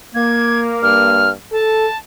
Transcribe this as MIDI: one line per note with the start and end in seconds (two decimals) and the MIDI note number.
0.15 1.31 58
0.15 0.60 92
0.83 1.32 43
0.83 1.30 89
1.52 1.87 69
1.52 1.98 81